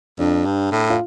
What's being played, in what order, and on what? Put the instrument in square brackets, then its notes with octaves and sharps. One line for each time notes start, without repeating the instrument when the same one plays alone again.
[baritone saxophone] F2 [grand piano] D4
[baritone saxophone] G2
A2
[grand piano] F4